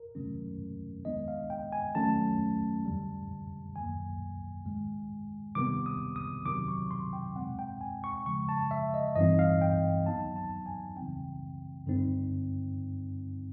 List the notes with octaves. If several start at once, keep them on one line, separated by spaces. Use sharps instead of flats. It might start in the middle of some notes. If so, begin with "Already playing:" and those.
Already playing: A#4
C3 D#3 F#3 A3 C#4
D#3 G#3 B3 D4 D#5
F5
G5
G#5
D#3 F#3 A3 C#4 A5
F2 D3 G3
F#2 D#3 F#3 A#3 G#5
G#2 D#3 G#3
C3 D#3 G3 B3 D6
D#6
D#6
C3 D#3 F#3 D6
C#6
C6
G5
B2 G#3 C4 F#5
G5
G#5
C#6
C#3 F3 G#3 C#6
A5
E5
D#5
G2 E3 G3 C4 D#4 D#5
F5
G5
D#3 F#3 B3 D#4 A5
A5
G#5
C#3 E3 G3 C4 G5
G2 D3 G3 C4 D#4